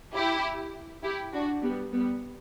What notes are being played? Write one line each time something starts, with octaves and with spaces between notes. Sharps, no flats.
E4 G4
E4 G4
D4 F#4
G3 B3
G3 B3